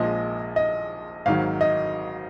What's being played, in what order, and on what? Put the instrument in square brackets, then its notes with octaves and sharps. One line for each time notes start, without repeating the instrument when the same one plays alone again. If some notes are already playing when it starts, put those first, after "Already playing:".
Already playing: [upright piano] A#1 A#2 F3 G#3 D#5
D#5
G#1 G#2 D#3 F#3 F5
D#5